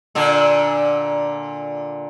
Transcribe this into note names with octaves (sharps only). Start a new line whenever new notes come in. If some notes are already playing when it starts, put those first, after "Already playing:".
A#2 D3 D4